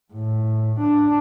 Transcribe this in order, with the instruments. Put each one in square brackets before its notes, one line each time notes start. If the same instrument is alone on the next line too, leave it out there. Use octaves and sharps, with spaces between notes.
[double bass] A2
D4